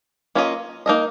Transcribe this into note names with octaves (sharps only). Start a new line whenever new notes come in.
A#3 C#4 F4 G#4 D#5
A#3 D#4 A#4 D#5